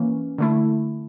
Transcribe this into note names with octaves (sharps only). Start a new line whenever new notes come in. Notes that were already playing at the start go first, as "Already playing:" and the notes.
Already playing: E3 A#3 C#4
D3 A3 E4